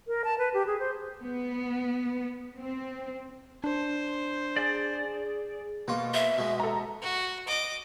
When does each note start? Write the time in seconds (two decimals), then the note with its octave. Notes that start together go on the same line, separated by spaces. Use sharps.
0.07 A#4
0.24 A5
0.38 B4
0.54 G4
0.67 G#4
0.80 C5
1.21 B3
2.57 C4
3.64 D4 C5
4.56 G#4 D5
5.88 B2 A#3 F4
6.14 E5
6.38 B2 G#3
6.60 A4 A#5
7.02 F#4
7.47 D#5 D6